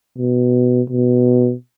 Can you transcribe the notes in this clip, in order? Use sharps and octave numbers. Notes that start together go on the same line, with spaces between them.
B2
B2